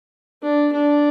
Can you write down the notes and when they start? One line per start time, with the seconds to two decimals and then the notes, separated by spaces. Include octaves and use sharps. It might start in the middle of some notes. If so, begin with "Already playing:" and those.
0.43 D4
0.73 D4